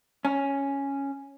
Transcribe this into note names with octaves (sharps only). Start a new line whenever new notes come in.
C#4